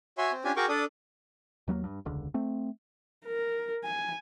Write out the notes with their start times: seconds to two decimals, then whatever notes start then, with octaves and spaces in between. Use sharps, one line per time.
0.18 F#4 C#5 E5 G#5 C6
0.32 C4
0.44 C#4 D4 F4 G4 G#5
0.56 F#4 G#4 A#4 G5 C#6 D6
0.69 D4 A4 D5 D#6
1.68 D#2 F#3 A3 A#3
1.84 G2
2.05 E1 C#2 D3
2.34 A3 C4
3.26 A#4
3.84 G#5